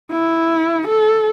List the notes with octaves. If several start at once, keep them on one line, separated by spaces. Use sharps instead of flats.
E4
A4